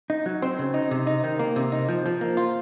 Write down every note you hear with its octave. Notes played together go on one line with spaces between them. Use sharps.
D#4
F#3
C4
C#3
D#4
C3
D#4
D#3
A#3
C3
D#4
F3
F3
A#3
F4